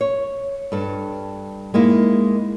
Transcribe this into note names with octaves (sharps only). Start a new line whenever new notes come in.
C#5
G2 A4
G#3 A#3 D#4 E4